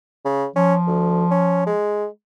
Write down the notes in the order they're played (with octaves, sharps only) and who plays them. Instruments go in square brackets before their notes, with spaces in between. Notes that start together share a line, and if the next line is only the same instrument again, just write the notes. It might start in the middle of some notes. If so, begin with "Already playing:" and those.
[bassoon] C#3
[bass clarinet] F3 [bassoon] C#4
[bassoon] D2
C#4
G#3